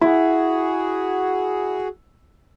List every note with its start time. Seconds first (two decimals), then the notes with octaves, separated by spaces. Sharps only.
0.01 E4 F#4 G#4